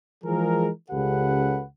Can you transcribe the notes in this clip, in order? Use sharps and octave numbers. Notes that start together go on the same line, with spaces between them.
E3 F3 G#3 G#4 A#4
C#2 C#3 G4 A4 B4 F#5